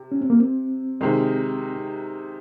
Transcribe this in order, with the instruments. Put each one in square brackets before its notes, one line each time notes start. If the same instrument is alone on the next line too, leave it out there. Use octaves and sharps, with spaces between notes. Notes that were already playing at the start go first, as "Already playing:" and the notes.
Already playing: [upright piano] C3
[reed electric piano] C#4
C4
A#3
C4
[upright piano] C3 D#3 G#3